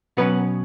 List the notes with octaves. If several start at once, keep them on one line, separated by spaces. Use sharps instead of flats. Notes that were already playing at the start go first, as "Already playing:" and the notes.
B2 F#3 B3 C#4 B4